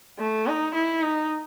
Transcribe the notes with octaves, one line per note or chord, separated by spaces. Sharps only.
A3
D#4
E4
D#4